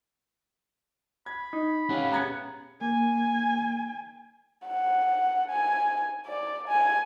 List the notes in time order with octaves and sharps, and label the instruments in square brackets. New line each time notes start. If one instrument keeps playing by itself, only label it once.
[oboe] B5 [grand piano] G#6
[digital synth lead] D#4
[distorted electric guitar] C#4 G4 [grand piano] C#5 F5 [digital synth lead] F#5
[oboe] B3 [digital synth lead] G#4 [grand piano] A#5 G#6 C#7
[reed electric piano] A#3 [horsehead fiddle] G#5
[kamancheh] F#5
G#5
D5
G#5